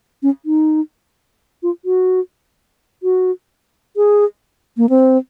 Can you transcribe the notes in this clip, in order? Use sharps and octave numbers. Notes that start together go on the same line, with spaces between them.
C#4
D#4
F4
F#4
F#4
G#4
A#3
C4